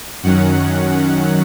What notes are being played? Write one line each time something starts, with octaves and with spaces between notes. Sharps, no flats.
F#2 D#3 F#3 C#4 F#5